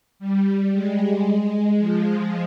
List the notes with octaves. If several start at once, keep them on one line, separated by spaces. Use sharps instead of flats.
G3
G#3
G#3
F3